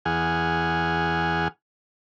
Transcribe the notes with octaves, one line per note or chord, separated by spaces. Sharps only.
E2 G#4 F#5 G#5 F6